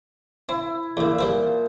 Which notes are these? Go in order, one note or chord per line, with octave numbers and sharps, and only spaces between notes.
C4 E4
E2 A#2 D3 E4 C5
F3 G3 C4 B4